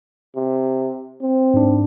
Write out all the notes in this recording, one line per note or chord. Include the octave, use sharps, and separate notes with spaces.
C3
C4
G#2 D4